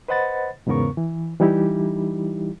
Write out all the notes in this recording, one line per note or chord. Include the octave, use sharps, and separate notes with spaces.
B4 C5 D#5 F#5 B5 A6
E2 G#2 C#3 B3 A#4 C#6
E3
E3 G3 D#4 E4 G4